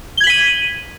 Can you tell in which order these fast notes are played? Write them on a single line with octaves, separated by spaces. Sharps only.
G7 G#6 F#7 B6 D#7